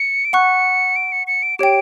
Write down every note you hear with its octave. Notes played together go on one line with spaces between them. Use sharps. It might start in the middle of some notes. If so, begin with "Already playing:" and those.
Already playing: C#7
D7
F#5 C#6 F#6 C#7
D7
C#7
C#7
D7
G4 C#5 G5 D7